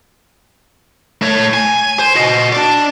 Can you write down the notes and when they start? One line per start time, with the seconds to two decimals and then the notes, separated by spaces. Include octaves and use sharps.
1.22 A3 C#5
1.54 G#5
1.99 C5
2.15 F#4 D#5
2.52 D4 D5